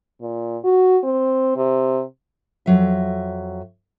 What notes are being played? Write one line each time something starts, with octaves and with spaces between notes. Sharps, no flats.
A#2
F#4
C4
C3
F2 F#3 E5